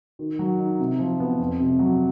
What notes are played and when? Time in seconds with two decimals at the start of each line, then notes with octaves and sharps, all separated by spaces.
0.19 D#3
0.39 F#3
0.59 D#4
0.80 C3
0.99 F3
1.20 B3
1.39 F2
1.60 C3
1.79 F#3